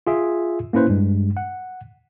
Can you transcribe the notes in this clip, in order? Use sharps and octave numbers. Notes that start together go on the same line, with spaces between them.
F4 G#4 E5
A#3 C#4 E4 B4 C5
G2 G#3
F#5